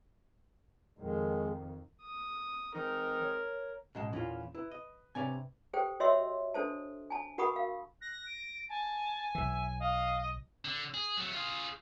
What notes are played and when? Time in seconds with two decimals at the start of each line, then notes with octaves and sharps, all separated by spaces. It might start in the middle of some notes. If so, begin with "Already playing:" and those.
0.99 F2 D#3 G#3
2.02 D#6
2.75 E3 G#3 C4 D#4 A#4
3.22 C#5
3.95 A1 B2 G#3 D#5 E7
4.13 E2 A#2 E3 C#4 F4
4.55 E4 B4
4.71 D#5
5.15 G2 C3 B3 C#5 D5 G#5
5.73 G4 A4 C5 G5
6.00 F#4 C#5 D#5 E5 C6 E6
6.54 D4 A4 C5 A5
7.10 G#5 A5
7.38 F#4 A#4 F#5 B5 C#6 D#6
7.56 F5
8.01 F#6 A#6
8.26 D7
8.69 G#5 A5
9.35 B1 E3 E5
9.80 D#5 F5
10.65 D3
10.94 G#4
11.17 F#3 A3
11.32 F4 G#4